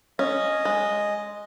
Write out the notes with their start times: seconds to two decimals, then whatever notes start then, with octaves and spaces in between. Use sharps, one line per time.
0.19 C#4 D#5
0.65 G#3